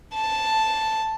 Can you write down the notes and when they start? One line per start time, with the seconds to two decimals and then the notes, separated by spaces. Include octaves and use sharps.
0.14 A5